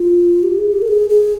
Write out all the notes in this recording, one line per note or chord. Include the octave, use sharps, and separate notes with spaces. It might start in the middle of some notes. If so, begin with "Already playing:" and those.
Already playing: F4
G4
G#4
G4
A#4
G#4
G#4